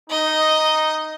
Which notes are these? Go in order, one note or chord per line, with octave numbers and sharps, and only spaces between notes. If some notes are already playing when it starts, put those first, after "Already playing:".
D#4 D#5